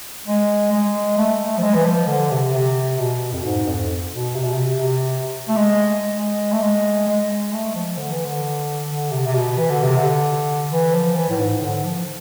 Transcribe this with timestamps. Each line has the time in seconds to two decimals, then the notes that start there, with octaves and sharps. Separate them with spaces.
0.27 G#3
0.72 G#3
1.18 A3
1.45 A3
1.58 F3
1.63 G#3
1.75 E3
1.85 F3
2.08 D3
2.31 C3
2.54 C3
2.99 B2
3.33 F2
3.44 G#2
3.67 F2
4.13 B2
4.35 C3
4.44 B2
4.53 C3
4.80 C3
5.48 A3
5.57 G#3
6.16 G#3
6.52 A3
6.62 G#3
7.08 G#3
7.30 G#3
7.53 A3
7.75 F3
7.98 D3
8.11 E3
8.25 D3
8.89 D3
9.11 C3
9.27 C3
9.35 B2
9.58 E3
9.70 D3
9.83 C3
9.97 D3
10.71 E3
10.94 F3
11.16 E3
11.30 A2
11.39 G#2
11.62 D3
11.84 F3